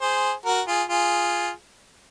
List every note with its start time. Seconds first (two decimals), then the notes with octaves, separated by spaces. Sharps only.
0.01 G#4 C5
0.45 F#4 A#4
0.67 F4 G#4
0.89 F4 G#4